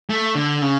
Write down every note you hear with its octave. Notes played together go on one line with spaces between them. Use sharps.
A3
D3
C#3